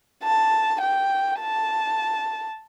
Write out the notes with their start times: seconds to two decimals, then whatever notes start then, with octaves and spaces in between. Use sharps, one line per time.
0.23 A5
0.81 G5
1.40 A5